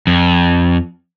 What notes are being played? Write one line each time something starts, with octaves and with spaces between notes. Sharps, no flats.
F2